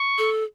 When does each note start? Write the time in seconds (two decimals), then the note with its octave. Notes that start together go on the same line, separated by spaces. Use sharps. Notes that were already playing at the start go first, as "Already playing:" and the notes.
Already playing: C#6
0.18 A4